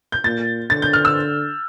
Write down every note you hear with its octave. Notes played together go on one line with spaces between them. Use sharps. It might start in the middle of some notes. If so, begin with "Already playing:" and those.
G6
A#2 A6
D3 A6
G6
F6
E6